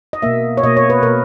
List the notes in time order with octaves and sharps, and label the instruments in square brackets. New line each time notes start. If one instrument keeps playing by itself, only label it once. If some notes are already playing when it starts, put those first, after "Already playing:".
[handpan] D#5
B2 A#3 E5
C#5
B2 A#3 D#5
C#5
B4
B2 A#3 A#4